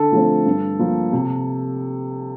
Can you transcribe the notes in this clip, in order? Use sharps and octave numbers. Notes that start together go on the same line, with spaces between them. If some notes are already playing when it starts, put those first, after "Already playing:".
Already playing: D3 A4
F3 A3 C4
G2
F3 A#3
C3